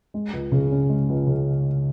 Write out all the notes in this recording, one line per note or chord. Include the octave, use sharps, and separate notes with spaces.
G#3
C#2
C#3
C#4
G#3
C#2
C#3